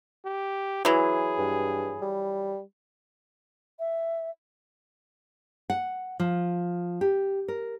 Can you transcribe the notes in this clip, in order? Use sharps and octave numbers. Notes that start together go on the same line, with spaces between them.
G4
E3 F#3 G#4
G2
G3
E5
F#5
F3
G4
A#4